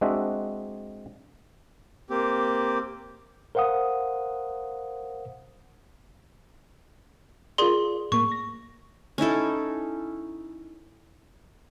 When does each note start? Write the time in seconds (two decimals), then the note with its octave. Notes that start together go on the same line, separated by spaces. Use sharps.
0.01 G#3 C4 D4 F#4 D#5 E5
2.10 A#3 C4 G4
3.55 A#4 C5 F5 F#5 D#6
7.58 F4 G#4 A#4 D5 C6
8.12 A2 A#3 C#6
8.32 A#6
9.18 C#4 D#4 E4 A4